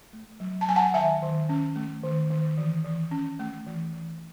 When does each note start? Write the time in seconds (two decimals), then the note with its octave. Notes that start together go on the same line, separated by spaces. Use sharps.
0.13 A3
0.40 F#3
0.61 A5
0.68 F#3 G#5
0.76 F#5 A5
0.94 D#3 E5 G#5
1.22 D#3
1.49 C#4
1.76 A3
2.04 D#3
2.30 D#3
2.58 E3
2.85 E3
3.11 C#4
3.39 A3
3.66 E3
3.93 E3